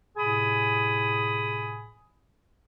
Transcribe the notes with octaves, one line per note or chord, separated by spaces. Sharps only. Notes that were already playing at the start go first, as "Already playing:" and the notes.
A2 C3 G#4 G#5 B5 D#6